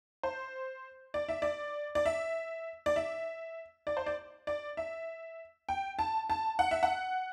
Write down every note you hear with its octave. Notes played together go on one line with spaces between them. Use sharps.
C5
D5
E5
D5
D5
E5
D5
E5
D5
C5
D5
D5
E5
G5
A5
A5
F#5
E5
F#5